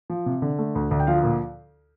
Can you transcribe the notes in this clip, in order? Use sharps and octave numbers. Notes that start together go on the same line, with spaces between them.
F3
C3
D3
A3
D2
D2
G5
F3 F4 F5
A#2